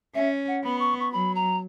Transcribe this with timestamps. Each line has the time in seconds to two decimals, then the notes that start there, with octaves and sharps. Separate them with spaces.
0.15 C#4 E5
0.48 F#5
0.64 B3 B5
0.80 C#6
1.00 C#6
1.12 F#3 B5
1.35 A#5